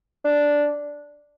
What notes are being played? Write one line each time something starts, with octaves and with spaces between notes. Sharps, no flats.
D4